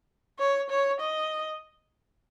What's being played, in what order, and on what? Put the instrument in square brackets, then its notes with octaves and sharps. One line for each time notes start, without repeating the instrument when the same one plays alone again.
[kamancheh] C#5
C#5
D#5